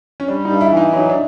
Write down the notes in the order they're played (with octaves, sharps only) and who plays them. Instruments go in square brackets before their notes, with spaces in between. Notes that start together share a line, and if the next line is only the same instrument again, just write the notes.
[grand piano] C#4
[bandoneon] G3 [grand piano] D4
[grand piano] D#4
[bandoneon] G2
[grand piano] E4
[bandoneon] E3
[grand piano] D#4
[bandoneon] F#3 [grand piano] D#4
[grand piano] D4